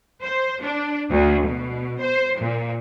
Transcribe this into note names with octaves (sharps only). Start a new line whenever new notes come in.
C5
D4
D2
B2
C5
A#2